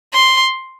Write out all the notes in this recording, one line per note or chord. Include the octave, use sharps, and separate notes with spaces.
C6